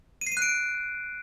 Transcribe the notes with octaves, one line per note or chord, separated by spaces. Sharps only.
D#7
C7
D#7
F#6
D7